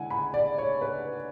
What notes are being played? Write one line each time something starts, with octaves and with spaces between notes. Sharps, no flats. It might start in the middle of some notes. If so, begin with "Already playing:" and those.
Already playing: D3 G#3 E4 F#5 G#5
B5
D5
C#5
B4